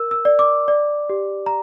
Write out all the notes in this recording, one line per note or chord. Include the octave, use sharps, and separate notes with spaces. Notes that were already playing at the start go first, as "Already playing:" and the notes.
Already playing: A#4 E6
E6
D5
D6
D5
G4
A#5